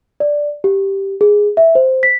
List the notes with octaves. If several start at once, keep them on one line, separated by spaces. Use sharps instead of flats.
D5
G4
G#4
E5
C5
B6